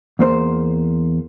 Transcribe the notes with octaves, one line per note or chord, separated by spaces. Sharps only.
E2 A#3 C5